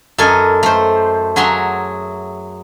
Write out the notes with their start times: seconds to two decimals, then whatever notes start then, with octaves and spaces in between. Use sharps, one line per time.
0.18 F#2 A4 A#4 D#5 G#5
0.63 A3 C5
1.36 F#3 G#4 E5 F#5 A#5 C6